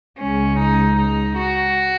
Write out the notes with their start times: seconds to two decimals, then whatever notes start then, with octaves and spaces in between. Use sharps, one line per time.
0.18 C#2 C#3 G#3 C#4
0.58 D#4
0.97 D#4
1.37 F#4